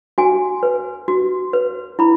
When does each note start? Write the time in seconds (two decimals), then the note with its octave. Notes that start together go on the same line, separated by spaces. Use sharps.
0.18 F#4 G#5
0.63 B4
1.08 F#4
1.53 B4
1.99 E4 B5